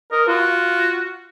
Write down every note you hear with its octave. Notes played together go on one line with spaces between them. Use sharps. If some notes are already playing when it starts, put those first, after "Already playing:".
A#4 D#5
F4 F#4